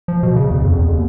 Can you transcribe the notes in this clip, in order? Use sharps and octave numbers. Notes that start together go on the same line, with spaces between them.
F3
B2
C#3
E2
F2
E2
D#2